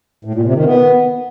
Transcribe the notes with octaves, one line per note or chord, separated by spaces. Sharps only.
A2
A#2
C3
D#3
B3